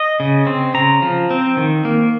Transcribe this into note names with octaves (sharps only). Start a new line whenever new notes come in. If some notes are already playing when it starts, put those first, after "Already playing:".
Already playing: D#5
C#3
C4
C#3 A#5
F3
C4
D#3
A#3